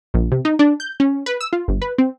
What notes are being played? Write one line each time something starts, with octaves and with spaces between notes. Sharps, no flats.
A#1
C3
D#4
D4
G6
C#4
B4
E6
F4
G1
B4
C4